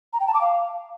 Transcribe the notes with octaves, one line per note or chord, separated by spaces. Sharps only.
A#5
G5
A5
D6
F5